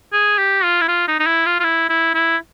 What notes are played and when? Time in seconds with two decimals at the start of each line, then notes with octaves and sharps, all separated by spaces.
0.13 G#4
0.38 G4
0.64 F4
0.81 E4
0.88 F4
1.08 D#4
1.20 D#4
1.27 E4
1.46 F4
1.60 F4
1.64 E4
1.90 E4
2.14 E4